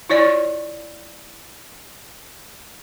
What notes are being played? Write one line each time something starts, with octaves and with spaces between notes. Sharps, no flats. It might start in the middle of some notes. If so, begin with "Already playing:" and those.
E4 F4 C#5 D5